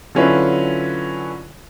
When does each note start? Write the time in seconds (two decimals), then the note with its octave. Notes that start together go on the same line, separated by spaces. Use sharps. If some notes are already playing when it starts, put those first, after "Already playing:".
0.15 D3 F#3 C#4 E4 F4 B4